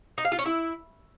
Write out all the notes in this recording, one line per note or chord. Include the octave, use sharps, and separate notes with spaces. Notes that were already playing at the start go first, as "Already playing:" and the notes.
D#4
F5
F4
C#4
E4